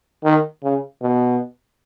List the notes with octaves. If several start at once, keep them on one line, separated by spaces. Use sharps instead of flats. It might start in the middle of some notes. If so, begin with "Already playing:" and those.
D#3
C#3
B2